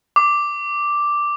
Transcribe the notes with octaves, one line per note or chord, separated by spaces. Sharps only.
D6